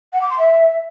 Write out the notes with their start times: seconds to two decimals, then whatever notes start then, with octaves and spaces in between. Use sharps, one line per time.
0.13 F#5
0.21 D6
0.30 C6
0.38 E5